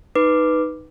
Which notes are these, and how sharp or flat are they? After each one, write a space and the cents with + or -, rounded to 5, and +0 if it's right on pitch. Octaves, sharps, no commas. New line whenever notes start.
D#4 +0 B4 +0 D6 +0